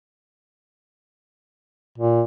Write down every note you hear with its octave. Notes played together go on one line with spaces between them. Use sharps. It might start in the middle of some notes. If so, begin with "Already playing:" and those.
A#2